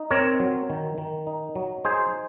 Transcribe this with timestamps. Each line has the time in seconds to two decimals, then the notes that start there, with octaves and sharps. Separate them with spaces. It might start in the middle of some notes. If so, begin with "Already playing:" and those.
Already playing: D#4
0.11 C4 A#4 C#5
0.40 F#3
0.70 D#3
0.98 D#3
1.27 D#4
1.55 F#3
1.85 D#4 G#4 C5